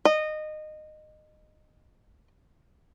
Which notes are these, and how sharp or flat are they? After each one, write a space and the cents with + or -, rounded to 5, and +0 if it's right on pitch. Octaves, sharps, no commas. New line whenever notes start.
D#5 -20